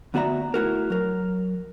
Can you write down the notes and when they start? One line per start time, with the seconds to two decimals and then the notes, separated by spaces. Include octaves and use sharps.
0.14 D2 B3 F#4 D5 E5 A#5
0.54 A3 E4 F#4 A#4
0.90 F#3 A#4